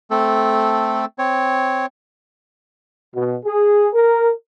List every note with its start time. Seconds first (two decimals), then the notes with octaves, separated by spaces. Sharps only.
0.11 A3 C4 A4
1.18 C4 C#5
3.15 B2
3.45 G#4
3.93 A#4